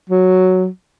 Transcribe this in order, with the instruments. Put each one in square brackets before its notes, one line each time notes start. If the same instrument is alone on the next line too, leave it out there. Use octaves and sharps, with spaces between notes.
[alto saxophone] F#3